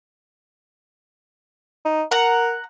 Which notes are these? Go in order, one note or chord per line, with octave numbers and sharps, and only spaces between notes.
D#4
A#4 F#5 A#5